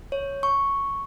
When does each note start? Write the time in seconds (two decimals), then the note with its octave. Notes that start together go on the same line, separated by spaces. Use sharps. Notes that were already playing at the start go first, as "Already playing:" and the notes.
0.12 C#5
0.43 C#6